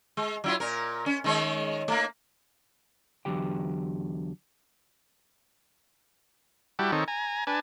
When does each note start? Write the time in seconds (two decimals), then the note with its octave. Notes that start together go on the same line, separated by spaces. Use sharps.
0.17 G#3
0.44 F#3 E4 F4
0.60 A#2 A#4
1.06 C#4
1.24 D#3 G#3 C#5
1.88 A3 A#3
3.25 E2 D3 D#3 F#3 G4 G5
6.79 G3 E4 F#4 G4 A5
6.92 D#3 C4 D#4 A4 C#5
7.08 G#5 A#5
7.47 D4 B4 G#5 A5